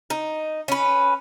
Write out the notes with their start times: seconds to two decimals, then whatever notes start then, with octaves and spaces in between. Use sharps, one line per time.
0.10 D#4
0.68 C#4 B4